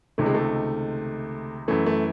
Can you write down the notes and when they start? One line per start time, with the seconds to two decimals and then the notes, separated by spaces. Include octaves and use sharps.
0.18 C#2 C3 D#3 A3
0.26 G#3
0.34 A3
1.68 F#2 E3 A3
1.86 A3